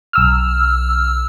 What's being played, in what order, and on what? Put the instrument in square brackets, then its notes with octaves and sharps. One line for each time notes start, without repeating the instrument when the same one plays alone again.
[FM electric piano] B1 E6 F6